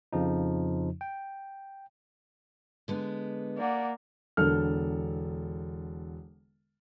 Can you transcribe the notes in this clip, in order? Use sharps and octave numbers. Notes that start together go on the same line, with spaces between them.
F2 C#3 F3 D#4
G5
D3 G#3 B3
A#3 D5 F#5
E1 D3 A4 F6